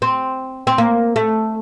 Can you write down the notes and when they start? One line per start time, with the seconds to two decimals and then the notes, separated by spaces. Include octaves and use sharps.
0.02 C4
0.67 C4
0.78 A#3
1.16 A3